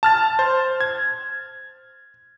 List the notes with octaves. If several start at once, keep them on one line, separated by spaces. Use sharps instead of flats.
A5 F6 A6
C5
G#6